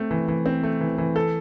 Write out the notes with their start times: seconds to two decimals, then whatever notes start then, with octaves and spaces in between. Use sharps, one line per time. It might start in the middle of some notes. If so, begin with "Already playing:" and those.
Already playing: A3 C4
0.11 E3
0.28 E3
0.46 C4
0.63 A3
0.81 E3
0.98 E3
1.16 A4